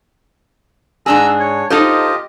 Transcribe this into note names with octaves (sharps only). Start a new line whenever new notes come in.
G#2 D4 G#4 A#5 E6
C#5
D#4 F4 G4 A4 C5 D#5